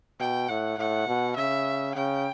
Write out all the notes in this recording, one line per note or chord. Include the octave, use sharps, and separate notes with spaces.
B2 G5
A2 F#5
A2 F#5
B2
C#3 E5
C#3 G5